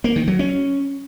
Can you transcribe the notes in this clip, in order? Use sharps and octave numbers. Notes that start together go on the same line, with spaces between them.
A#3
D#3
F#3
C#4